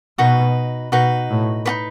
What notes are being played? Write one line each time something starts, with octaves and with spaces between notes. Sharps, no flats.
B2 D#4 F#4 B4
B2 D#4 F#4 B4
A2
D#4 F#4 B4